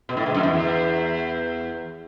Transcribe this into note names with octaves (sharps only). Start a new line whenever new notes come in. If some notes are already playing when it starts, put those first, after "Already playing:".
B2
A2
G#2
F#2
E2